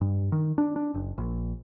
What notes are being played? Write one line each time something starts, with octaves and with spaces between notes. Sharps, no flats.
G2
D#3
D4
D4
F#1
A#1